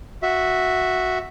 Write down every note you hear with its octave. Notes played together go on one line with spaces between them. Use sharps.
F#4 E5